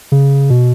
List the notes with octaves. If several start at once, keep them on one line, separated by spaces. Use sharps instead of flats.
C#3
B2